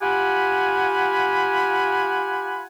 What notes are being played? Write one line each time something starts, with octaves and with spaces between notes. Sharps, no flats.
F4 G4 F#5 G#5 B5